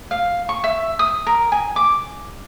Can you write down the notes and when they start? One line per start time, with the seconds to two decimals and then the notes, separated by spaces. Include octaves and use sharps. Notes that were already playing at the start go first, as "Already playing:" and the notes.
0.11 F5
0.49 C#6
0.64 E5
0.99 D#6
1.27 A#4
1.52 G#5
1.76 D6